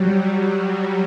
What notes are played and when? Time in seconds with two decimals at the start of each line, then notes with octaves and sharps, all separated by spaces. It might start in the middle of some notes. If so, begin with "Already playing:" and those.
Already playing: F#3 G3
0.10 G3